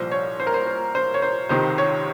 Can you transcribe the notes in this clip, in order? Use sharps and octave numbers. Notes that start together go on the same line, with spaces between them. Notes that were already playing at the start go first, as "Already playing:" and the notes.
Already playing: C2 A#2 F3 C5
C#5
C5
A#4
C5
C5
C5
C#5
C5
C#2 C3 D#3 C5
C#5